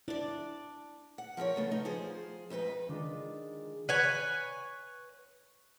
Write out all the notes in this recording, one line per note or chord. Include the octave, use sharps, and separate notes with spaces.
D4 E4 D5
F#5
F3 C4 A#4 C#5
C#3 A3 B3
D#4
F3 G#4 C5
F2 G#2 D#4 B4
D#3 G#3 D4 F4
B4 C#5 G#5